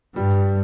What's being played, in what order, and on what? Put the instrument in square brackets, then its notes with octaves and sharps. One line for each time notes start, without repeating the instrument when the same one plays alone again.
[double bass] G2 [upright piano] G3